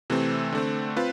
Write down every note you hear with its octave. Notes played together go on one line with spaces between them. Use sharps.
C3 E3 A3 C4
D3 A3 C4
C4 F4 B4